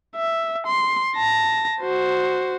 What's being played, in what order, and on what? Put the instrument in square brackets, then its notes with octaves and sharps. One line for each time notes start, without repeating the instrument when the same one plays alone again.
[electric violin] E5
C6
A5 A#6
F#4 C5